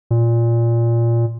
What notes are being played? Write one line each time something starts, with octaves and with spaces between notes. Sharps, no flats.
A#2